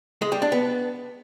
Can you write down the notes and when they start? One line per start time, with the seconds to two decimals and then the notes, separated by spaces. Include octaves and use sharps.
0.22 G#3
0.32 G3
0.42 D4
0.52 B3